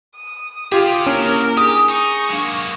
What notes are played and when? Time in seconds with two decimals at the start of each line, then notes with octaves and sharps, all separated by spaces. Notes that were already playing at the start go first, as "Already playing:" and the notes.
0.15 D#6
0.72 F4 G4 G#4 F5
1.06 A#3 C#4 D4 E4 A#4
1.58 G4 G#4 G#5 D#6
1.89 D#4 C#6
2.30 F#3 G#3 A#3 D4 F5